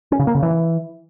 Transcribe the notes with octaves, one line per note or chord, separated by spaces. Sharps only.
C#4
C#3
A#3
C#3
E3